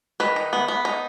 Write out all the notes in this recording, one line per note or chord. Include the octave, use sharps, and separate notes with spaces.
D#3 B4
D#4
B3
B3
D#4